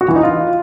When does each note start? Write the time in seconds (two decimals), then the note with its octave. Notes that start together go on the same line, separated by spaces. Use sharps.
0.01 F#4
0.08 E3
0.16 D#4
0.23 F4